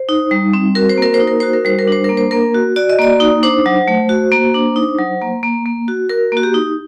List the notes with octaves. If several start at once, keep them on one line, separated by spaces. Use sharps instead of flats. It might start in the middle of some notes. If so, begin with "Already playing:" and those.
Already playing: C5
D#4
G3
C4
F#4 A#4
C5
A#3 A#4
C5
D#4
A#4
F#4 C5
A#4
G3 C5
A#4
D4 C5
A#3 A#4
C5
A#3 A#4
F#4
F#4 D5
D#5
A#3 D5
D#4
D4 C5
F#3
A3
F#4
A#3
D4
D#4
F#3
A#3
A#3
A#3
F#4
F#4 A#4
A#3 F#4
G4
D#4